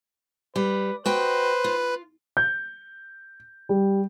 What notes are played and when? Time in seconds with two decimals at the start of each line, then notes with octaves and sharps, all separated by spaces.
0.56 G3 B4
1.06 F#4 B4 C5 D#5 G5
1.64 F4
2.37 G6
3.69 G3